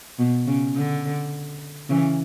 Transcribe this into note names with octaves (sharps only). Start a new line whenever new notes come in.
B2
C#3
D3
C#3 E3